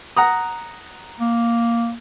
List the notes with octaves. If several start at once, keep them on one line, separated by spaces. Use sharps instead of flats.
F#5 A#5 D#6
A#3